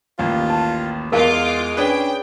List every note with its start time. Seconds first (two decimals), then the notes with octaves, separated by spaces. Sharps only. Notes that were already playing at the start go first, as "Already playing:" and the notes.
0.19 A1 D#2 F4
0.50 A5
1.12 E2 G#3 F4 A#4 F5 D6
1.77 C#4 D4 G#4 B4 G5